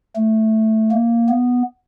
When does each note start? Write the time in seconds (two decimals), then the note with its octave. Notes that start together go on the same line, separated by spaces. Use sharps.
0.16 A3
0.92 A#3
1.29 B3